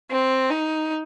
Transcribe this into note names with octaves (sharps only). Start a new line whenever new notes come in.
C4
D#4